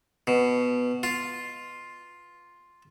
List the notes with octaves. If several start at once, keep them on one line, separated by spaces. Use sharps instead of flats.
B2
F4